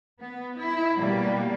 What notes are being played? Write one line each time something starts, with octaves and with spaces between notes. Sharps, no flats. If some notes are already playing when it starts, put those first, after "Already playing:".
B3
E4
B2 G3 A#3